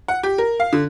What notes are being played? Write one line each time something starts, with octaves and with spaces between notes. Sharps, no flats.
F#5
G4
A#4
F5
D3